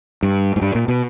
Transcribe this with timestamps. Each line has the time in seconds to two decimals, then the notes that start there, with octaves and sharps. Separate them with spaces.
0.23 G2
0.56 G#2
0.62 G2
0.75 A#2
0.88 B2